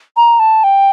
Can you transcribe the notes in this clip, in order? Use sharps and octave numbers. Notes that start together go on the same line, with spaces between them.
A#5
A5
G5